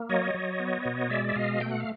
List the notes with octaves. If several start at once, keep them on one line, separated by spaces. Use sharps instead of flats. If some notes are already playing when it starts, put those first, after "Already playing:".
Already playing: A#3
F#3 C#5 D#5
F#3
B3
B2
G#3 D5 E5
E5
B2 D#5 F5
A3 G5
F#5
F5